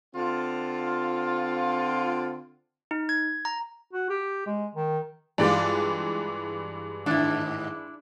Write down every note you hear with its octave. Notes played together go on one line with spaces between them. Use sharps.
D3 C4 F4
D#4
G#6
A#5
F#4
G4
G#3
D#3
G2 E3 G#3 F4 G4 D5
G#2 D#3 D4 E4